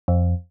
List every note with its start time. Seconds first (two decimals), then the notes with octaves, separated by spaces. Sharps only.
0.08 F2